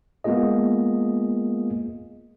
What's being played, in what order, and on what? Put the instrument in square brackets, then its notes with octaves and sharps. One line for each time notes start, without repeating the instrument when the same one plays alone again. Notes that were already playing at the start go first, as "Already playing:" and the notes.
[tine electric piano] G#3 A#3 B3 F4 G#4 D#5